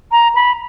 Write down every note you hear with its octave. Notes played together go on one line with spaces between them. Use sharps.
A#5
B5